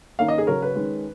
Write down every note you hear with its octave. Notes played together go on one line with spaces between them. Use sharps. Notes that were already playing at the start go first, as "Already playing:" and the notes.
D#3 A#3 C#4 F5
D#5
G#4
C#3 F#3 C#4 A#4
B4
D#3 G#3 C#4